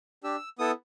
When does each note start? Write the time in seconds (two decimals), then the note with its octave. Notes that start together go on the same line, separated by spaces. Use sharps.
0.23 D4 G4 E6
0.59 B3 E4 A4 D#6